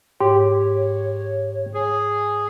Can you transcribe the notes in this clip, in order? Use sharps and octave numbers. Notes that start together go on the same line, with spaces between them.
G#2 G4 C#5
G#4